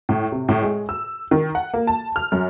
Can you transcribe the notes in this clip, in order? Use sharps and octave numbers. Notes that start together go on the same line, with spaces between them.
A2
C3
A2
G#3
E6
D#3
F#5
A#3
A5
F6
F#2